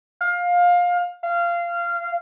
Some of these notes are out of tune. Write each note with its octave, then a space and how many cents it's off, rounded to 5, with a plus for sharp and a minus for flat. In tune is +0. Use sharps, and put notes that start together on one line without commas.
F5 +20
F5 -20